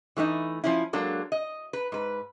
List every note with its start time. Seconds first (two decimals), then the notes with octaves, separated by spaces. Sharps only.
0.17 E3 A3 C4 D#4 E4
0.64 F3 C#4 E4
0.93 F#3 G#3 A#3 D4 A4
1.32 D#5
1.73 B4
1.92 G#2 B4